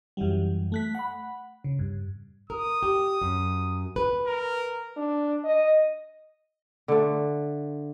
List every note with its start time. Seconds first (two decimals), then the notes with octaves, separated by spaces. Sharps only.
0.17 F#2 E3 F#3 G3
0.72 A3 F#6 B6
0.95 F#5 B5
1.64 C#3
1.79 G2
2.50 A#4 D#6
2.83 G4
3.22 F#2
3.96 B4
4.27 A#4
4.96 D4
5.44 D#5
6.88 D3 A3